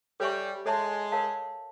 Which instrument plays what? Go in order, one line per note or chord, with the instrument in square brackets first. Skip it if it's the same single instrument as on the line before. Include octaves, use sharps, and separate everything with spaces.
[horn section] G3 [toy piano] A4 C#5 E5 G#5 C#6
[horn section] G#3 [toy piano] A4 C#5 E5 A5 C6
[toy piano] A#4 C#5 F5 A5